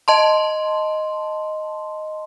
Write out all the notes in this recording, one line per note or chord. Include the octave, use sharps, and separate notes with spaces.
D#5 A5 C6